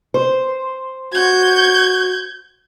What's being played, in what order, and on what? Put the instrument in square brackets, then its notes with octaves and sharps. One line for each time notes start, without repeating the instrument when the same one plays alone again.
[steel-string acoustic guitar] C5
[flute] F#4 [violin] G6 G#6